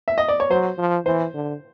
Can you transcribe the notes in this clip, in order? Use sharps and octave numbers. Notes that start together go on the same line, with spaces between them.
E5
D#5
D5
C#5
F#3 C5
F3
E3 C5
D3